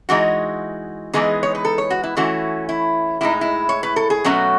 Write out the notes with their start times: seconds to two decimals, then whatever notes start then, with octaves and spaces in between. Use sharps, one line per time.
0.09 E3 G#3 D#4 F#4
1.13 E3 G#3 B3 D#4 G#4
1.43 C#5
1.55 B4
1.65 A4
1.78 C#5
1.90 F#4
2.03 E4
2.17 E3 A3 C#4 E4 F#4
2.69 E4
3.21 A2 G#3 D#4 E4
3.41 E4
3.69 C#5
3.83 B4
3.96 A4
4.10 G#4
4.25 B2 F#3 A3 C#4 F#4